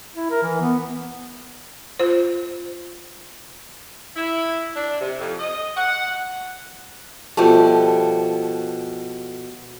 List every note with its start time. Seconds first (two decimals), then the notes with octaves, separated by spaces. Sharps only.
0.15 E4
0.31 A#4
0.43 E3
0.61 B3
1.99 F4 C5
4.16 E4
4.75 D4
5.00 C3
5.19 F2
5.39 D#5
5.76 F#5
7.37 B2 F3 G3 A3